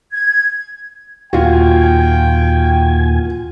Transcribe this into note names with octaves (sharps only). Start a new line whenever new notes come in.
G#6
D#2 A#2 F4 F#4 G5 G#5